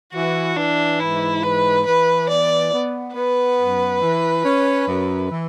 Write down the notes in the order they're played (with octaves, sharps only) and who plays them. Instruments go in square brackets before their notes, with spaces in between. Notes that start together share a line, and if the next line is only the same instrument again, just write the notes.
[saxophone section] E3 [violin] F#4
[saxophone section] E3 [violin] D4
[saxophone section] G#2 [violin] E4
[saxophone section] E3 [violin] B4
[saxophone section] E3 [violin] B4
[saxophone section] B3 [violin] D5
[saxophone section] B3
[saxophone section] B3 [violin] B4
[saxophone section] F#2
E3
C#4
F#2
E3